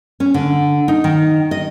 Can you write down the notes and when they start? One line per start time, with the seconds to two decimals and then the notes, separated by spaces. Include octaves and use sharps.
0.20 C#4
0.34 D3
0.88 D#4
1.04 D#3
1.51 D#5